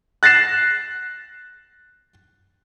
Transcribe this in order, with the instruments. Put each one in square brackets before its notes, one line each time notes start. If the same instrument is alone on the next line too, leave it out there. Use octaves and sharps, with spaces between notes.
[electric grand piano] F#6 A6 A#6 C7 E7